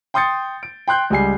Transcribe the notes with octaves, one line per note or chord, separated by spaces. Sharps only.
G5 C6 D#6 G6 A6 C#7
D7
G5 C6 F#6 G6
C#2 G3 G#5 C7